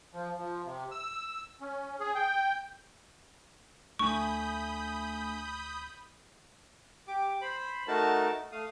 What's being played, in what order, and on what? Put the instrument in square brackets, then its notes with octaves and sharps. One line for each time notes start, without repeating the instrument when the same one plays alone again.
[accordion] F3
F3
C3
E6
C#4
G#4
G5
[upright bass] D2 [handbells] A3 D4 G#5 [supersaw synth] B5 D#6 G6 [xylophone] C#6
[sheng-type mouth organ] G4 D6
C5 B5
A3 D#4 F#4 A#4 A5
A3 F5 D#6